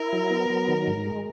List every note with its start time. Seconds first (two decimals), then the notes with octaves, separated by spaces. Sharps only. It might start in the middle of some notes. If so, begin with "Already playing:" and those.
Already playing: E4 A#4
0.13 F#3
0.31 B3
0.50 F#3
0.68 D#3
0.88 G#2
1.06 G#3